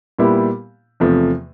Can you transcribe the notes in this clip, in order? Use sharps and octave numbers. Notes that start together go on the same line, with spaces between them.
A#2 G3 B3 E4 G4
E2 C3 F3 A3